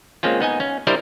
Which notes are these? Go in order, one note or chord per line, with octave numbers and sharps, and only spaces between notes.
G#3 A#3 C4 C#4 F4
B3 D#4 D#5 G#5
C#4
G3 D4 E4 A#4 C5 D#5